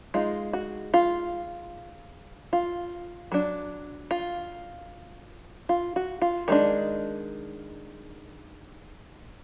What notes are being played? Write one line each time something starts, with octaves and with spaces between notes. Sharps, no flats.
G#3 D#4 F4
F#4
F4
F4
F#3 D4
F4
F4
F#4
F4
D#3 G#3 D4 D#4